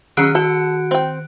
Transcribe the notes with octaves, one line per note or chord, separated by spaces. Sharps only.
D#3 F#3 C#4 F#6 D7
F#4 A4 F#5
C4 G5